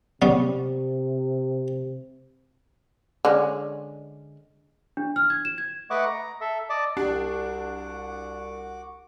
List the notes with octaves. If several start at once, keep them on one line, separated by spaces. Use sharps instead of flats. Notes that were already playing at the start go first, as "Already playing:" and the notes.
C3 G3 B3 C#4
D3 G#3 C#4
D4
F6
G#6
E7
G#6
A3 B4 D#5 F#5 C#6 D6
A#5
A4 E5
D5 D#5 A5 D6
C2 D4 F#4 G4 F#5 D6